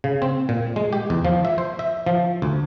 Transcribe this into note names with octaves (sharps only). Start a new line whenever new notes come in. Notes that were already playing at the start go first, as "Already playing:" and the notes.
C#3
C4
A#2
G#3
G4
E2
F3
E5
C5
E5
F3
D2